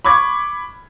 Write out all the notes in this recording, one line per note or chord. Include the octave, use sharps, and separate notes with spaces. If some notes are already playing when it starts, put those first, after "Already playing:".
B5 C#6 D6 G#6